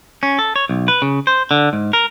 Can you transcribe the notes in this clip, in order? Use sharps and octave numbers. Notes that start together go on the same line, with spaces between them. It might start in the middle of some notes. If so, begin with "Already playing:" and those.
C#4
A4
C#5
B1
B4
C#3
C5
D3
G#2
A#4